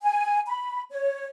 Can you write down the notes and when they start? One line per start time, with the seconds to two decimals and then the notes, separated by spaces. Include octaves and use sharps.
0.03 G#5
0.46 B5
0.90 C#5